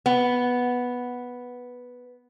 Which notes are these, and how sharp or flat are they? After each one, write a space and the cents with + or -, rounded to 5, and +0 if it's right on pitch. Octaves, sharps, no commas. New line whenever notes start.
B3 -5